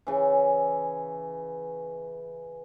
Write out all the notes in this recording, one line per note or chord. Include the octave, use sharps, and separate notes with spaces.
C#3 E3